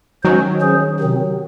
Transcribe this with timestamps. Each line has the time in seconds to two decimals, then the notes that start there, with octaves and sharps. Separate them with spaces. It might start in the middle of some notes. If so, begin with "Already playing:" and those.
0.23 D#3 F#3 G#3 C#4 F#4 C5
0.61 F#3 C#4 G#4 C5
1.00 C3 D#3 F#3 C4